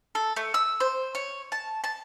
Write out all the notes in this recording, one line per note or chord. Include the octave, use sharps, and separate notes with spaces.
A4
A3
E6
C5
C#5
A5
A5